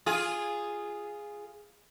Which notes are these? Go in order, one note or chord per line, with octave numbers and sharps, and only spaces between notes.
F4 G#4